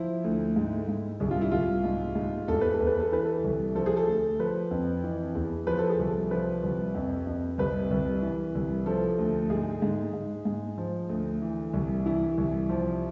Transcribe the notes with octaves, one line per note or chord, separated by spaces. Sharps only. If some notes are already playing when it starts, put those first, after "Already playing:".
Already playing: F3 E4
D2
G#2
G#2
C2 G#4
F4
E4
C2 F4
G#2
G#2
E2 A4
B4
A4
E2
B4
A4
E3 B4
A4
C2
F3 A4
G#4
A4
D2
F3 B4
F2
E3
E2
F3 B4
A4
G#4
C2 A4
F3 B4
C2
F2
F2
C2 B4
C2
E3
C2
F3 A4
D2
G#2 G#4
G#2
G#2
G#2
F3
D2
E3
C2
E3 E4
C2
F3